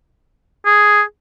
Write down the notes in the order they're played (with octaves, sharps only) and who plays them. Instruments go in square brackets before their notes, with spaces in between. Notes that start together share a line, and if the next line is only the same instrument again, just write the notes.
[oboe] G#4